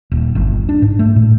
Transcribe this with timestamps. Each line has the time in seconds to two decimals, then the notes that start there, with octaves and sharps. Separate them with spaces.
0.11 D#1
0.35 G1
0.69 D4
0.82 G#2
0.99 A3
1.16 A2